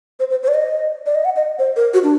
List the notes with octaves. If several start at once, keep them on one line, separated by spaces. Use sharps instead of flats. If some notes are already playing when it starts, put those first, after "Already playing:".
C5
C5
C5
D5
D#5
D5
D#5
F#5
D#5
C5
A#4
F#4
D4